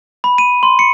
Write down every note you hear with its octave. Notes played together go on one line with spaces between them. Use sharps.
B5
D#7
C6
C#7